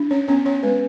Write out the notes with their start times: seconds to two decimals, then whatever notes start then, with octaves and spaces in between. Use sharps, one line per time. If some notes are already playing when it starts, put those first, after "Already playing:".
Already playing: D4
0.11 C#4 C#5
0.28 B3 C#4 C#5
0.45 C#4 C#5
0.63 G#3 B3 B4